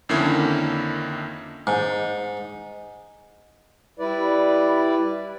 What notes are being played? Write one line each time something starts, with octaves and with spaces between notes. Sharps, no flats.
F2 D3 D#3 A#3 C#4 E4
G#2
G3 E4 B4 D5